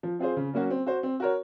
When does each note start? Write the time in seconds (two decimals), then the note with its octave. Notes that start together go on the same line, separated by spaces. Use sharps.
0.03 F3
0.19 C4 F4 G#4 C5
0.37 C#3
0.54 F#3 A#3 C#4 F#4
0.71 C4
0.86 F#4 C5
1.03 C4
1.20 F#4 A#4 C#5